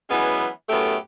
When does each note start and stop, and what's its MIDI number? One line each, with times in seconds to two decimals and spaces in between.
0.10 0.48 52
0.10 0.48 54
0.10 0.48 56
0.10 0.48 59
0.10 0.48 61
0.69 0.96 42
0.69 0.96 45
0.69 0.96 57
0.69 0.96 59
0.69 0.96 67